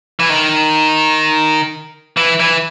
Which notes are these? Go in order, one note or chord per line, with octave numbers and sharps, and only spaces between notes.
E3
D#3
E3
E3